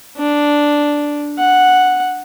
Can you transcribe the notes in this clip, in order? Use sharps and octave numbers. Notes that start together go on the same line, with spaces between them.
D4
F#5